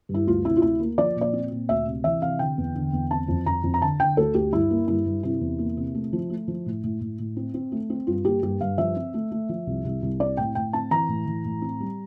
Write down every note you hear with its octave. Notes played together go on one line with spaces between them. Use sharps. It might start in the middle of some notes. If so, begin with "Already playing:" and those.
G2
E4
D2 F4
C3 E4
F4
D2 E4
A#3
F3 D5
A#2
D5
C4
A#2
D2 E5
C3
E3 E5
C3 F5
D3 G5
E2
D3
E2
C4 A5
F2
F2 A#5
F2
A#5
D3 A5
D3 G5
D2 A4
D2 G4
G2 E4
A#3
G2 E4
G2
C3 E4
E2
A#3
C3
A3
F3
A3
F3
A2
A2
A2
A2
C4
C4
A3
C4
G2 F4
A#3 G4
G2 G4
G2 F5
F3 E5
C4
A3
A3
F3
C2
C2
C2
C4 D5
A2 G5
A2 G5
C4 A5
E3 A#5
A2
E3
A2
C4
G3